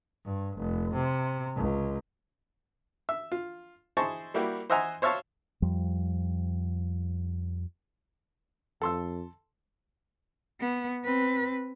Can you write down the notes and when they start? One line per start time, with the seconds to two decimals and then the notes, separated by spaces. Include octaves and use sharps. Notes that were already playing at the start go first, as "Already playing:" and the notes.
0.25 G2
0.58 F1
0.94 C3
1.56 C#2
3.09 E5
3.32 F4
3.97 E4 G#4 C5 D#5 A5 C#6
4.34 G3 A#3 E4 F#4 G4
4.70 C5 D#5 E5 F#5 G#5 A#5
5.02 C5 C#5 E5 F5 A5 C#6
5.62 F2 F3 G3
8.82 F2 A4 C6 E6
10.60 B3
11.04 C4 B4